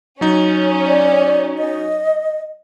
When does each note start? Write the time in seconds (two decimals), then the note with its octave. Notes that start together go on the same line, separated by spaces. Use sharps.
0.21 F#3 C#4 D#4
0.87 D5
1.58 D#5